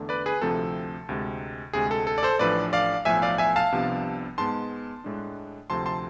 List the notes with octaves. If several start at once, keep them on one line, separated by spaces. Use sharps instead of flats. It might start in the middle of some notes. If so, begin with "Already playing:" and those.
Already playing: E2 D3 A3 D4
B4 D5
G#4 B4
D2 C3 F3 A3 C4 A4
D2 C3 G#3
D2 C3 G#3 G#4
A4
A4
D5
A4 C5
A1 A2 F3 A3 D4 B4 D5
D5 F5
B1 A2 F3 A3 E5 G#5
D5 F5
E5 G#5
F5 A5
C2 C3 F3 B3 D4
G#2 G#3 B3 A5 C6
A2 G#3 D4
D2 C3 F3 A3 C4 A5 C6
A5 C6